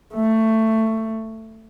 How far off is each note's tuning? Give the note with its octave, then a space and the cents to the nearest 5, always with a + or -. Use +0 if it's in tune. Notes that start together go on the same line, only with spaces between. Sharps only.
A3 +15